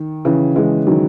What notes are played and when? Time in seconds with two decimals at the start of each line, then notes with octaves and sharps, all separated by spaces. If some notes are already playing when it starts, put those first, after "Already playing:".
Already playing: D#3
0.25 C#3 E3
0.56 E3 G#3
0.87 D#3 F#3